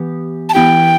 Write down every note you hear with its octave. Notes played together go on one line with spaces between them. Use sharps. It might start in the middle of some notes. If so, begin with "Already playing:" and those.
Already playing: E3 B3 G4
A5
E3 B3 E4 G4 G5